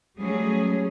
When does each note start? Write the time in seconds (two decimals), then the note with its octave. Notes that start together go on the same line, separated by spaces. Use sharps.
0.19 F#3 G3 A3 C#4 G#4